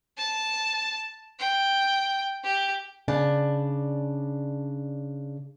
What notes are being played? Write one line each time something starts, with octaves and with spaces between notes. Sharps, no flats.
A5
G5
G4
C#3 D4 A5